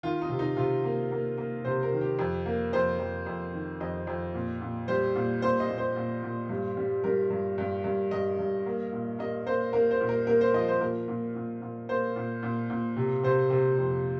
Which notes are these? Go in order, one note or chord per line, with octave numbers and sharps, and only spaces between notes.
D#3 F4
D#4
C3
D#4
C3 F4
A#3
A#3
A#3
C3 C5
A#4
D#3
G4
F2
A#3
F2 C5
F2
F2
D#3
F2 D#5
F2
A#2
A#2
G3 C5
A#2
A#2 C5
D#5
A#2
C5
A#2
A#2
G2
G3
G3 A#4
G2
G2
G2
G2 D#5
G2
A#3
A#2
A#3 D#5
A#3 C5
A#3 A#4
C5
A#2
A#4
A#3 A#4
C5
F3 D#5
C5
A#2 A#4
A#2
A#2
A#2
A#3 C5
A#2
A#2
A#2
C3
C3 C5
C3
F2